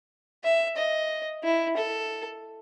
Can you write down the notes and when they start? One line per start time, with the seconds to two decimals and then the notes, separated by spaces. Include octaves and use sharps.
0.44 E5
0.77 D#5
1.44 E4
1.77 A4